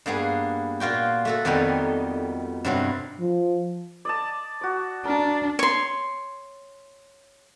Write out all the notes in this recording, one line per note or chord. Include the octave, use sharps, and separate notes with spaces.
G2 A#3 B3 G#4
A#2 F4 F#4 G5
A3 F#4 A4
F2 B2 D#3 G3 B3 D#4
G2 C3 F#3 B3
F3
D5 D#5 A5
F#4 D5
D4 A#4
C#5 C6